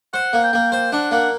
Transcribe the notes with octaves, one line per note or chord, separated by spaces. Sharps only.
C5 F#5
A#3
G5
A#3
C5 G5
D4 F#5
A#3 F#5